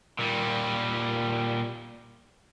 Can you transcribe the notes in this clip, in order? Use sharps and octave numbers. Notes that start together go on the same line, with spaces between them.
A#2 G3